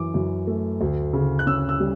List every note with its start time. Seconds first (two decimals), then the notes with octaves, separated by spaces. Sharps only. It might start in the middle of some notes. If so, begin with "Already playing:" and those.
Already playing: F#2 E3 D6
0.14 F#2
0.47 A3
0.81 D2
1.13 C#3
1.39 F#6
1.47 C#4 E6
1.69 E6
1.80 G3